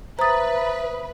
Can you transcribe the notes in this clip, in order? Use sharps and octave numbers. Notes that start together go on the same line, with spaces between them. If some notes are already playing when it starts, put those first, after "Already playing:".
B4 C5 E5 A#5 D#6 A6